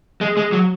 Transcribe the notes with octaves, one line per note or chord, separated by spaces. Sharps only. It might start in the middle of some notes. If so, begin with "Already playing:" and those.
G#3
G#3
F#3